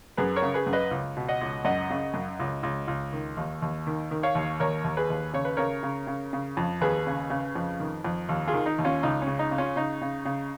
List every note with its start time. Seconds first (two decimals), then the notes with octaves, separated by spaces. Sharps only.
0.17 F#2 G#4 B4
0.36 A#4 C#5
0.42 C#3
0.54 G#4 B4
0.66 F#2
0.73 B4 D#5
0.91 C#2
1.17 B2
1.28 D#5 F#5
1.41 C#2
1.65 F#2 D#5 F#5
1.90 C#3
2.14 F#2
2.40 C#2
2.63 C#2
2.88 C#2
3.13 D#3
3.37 D#2
3.62 D#2
3.87 D#3
4.11 D#3
4.23 C#5 F5
4.35 D#2
4.60 D#2 A#4 C#5
4.84 D#2
4.97 G#4 B4
5.10 D#2
5.33 C#3 C#5
5.45 B4
5.57 C#3 A#4 C#5
5.83 C#3
6.07 C#3
6.33 C#3
6.57 F2
6.81 D#2 G#4 B4
7.07 C#3
7.30 C#3
7.55 F2
7.80 D#3
8.05 F2
8.29 D#2
8.47 F4 G#4
8.54 D#3
8.66 D#4
8.78 D#2
8.84 C#4 F4
9.03 C#2 D#4
9.22 C#3 C#4
9.39 D#4
9.51 C#3
9.58 C#4 F4
9.76 C#3 D#4
10.02 C#3
10.25 C#3